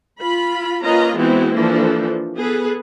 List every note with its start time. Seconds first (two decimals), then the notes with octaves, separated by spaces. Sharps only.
0.20 F4 B5
0.83 A#3 C#4 F4 B4 D#5 A#5
1.18 E3 G#3 B3 C4 E4 F#4
1.55 E3 F3 A#3 D4 A4
2.36 B3 G#4 A4 B4